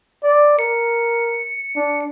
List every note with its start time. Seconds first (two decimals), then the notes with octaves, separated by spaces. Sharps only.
0.23 D5
0.59 A#4 C#7
1.76 D4